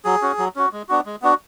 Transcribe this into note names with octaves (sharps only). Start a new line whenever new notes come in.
F#3 G#4
C#4 F#4
F#3
C#4 F#4
G#3
B3 D4 F#4
G#3
B3 D4 F#4